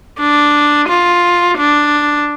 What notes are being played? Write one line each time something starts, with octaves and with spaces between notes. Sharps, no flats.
D4
F4
D4